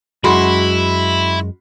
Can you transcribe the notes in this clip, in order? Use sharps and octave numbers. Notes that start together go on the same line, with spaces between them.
F#2 G#3 E4 F#4 B5 C6